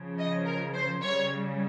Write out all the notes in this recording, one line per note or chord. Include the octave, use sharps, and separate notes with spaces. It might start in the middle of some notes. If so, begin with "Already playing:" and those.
Already playing: C#3 F3
D#5
A#4
C5
C#3 G3 C#5